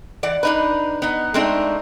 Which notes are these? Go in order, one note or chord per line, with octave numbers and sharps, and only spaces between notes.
E3 D5 F#5
D4 D#4 B4
B3 D#4
G#3 A3 C4 D4 D#4